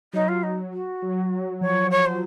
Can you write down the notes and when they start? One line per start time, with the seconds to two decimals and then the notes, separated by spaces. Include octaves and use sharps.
0.13 F#3 D#4
0.28 F#3 F4
0.43 D#4
0.72 F#4
1.02 F#3
1.61 F3 C#5
1.90 C#5
2.05 C5